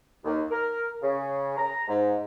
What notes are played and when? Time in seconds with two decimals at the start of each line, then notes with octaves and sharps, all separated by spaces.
0.24 D#2
0.51 A#4
1.03 C#3
1.57 A#5
1.88 G#2